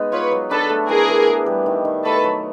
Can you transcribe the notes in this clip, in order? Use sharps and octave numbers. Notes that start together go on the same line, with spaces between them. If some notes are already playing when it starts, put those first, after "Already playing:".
Already playing: G#3 B3 D#4
F4 B4 C#5
F#3
D4 A4 B4
A3
E4 G#4 A#4
E3
B3
G3
D#3
D#3
A3 A4 B4
F#3